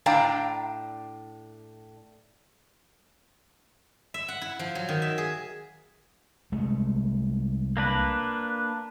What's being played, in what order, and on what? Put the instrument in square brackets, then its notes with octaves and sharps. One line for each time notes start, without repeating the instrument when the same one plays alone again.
[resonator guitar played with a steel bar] A2 D4 D5 F5 G5 A#5
[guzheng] E5
F#5
E4
F3
F#3
D#3
E5
G#4
[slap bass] C2 G#3 A3
[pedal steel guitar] A#3 D4 B4